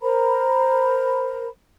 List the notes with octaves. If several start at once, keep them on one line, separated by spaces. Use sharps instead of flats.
A#4 C5 A#5 B5